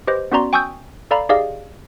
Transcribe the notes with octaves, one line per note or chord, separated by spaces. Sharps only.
G4 B4 C5 D#5
B3 C#4 F#4 D5 A#5 C6
G5 G#5 C#6 D#6 E6 G6
A4 D5 F5 A#5 B5
D#4 G4 G#4 D5 D#5 F5